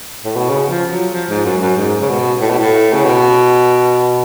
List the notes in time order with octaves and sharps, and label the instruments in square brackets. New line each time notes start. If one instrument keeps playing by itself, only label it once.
[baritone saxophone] A2
B2
C#3
F3
F#3
F3
G#2
F#2
F#2
G#2
C#3
B2
A2
B2
A2
C#3
B2